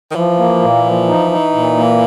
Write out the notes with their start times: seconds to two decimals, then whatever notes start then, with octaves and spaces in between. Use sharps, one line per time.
0.11 D#3
0.15 E3 F3
0.39 A#3
0.62 A#2
0.85 F3
1.08 D#4
1.32 D#4
1.54 A#2
1.77 A#3